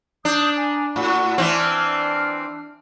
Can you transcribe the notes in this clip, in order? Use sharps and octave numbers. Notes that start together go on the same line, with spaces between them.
D4 D#6 G6
G#5 A#5
A2 F#4 F#5 C#6
E3 C4 D4 F6